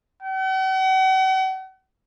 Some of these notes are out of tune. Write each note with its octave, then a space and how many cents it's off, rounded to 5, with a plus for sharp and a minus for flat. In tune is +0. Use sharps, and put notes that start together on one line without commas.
F#5 +45